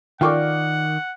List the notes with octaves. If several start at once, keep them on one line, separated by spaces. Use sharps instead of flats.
D#3 F4 A#4 D5 F#5 G5 C#6 D6